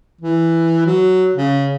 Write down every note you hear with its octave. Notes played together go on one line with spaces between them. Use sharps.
E3
F#3
C#3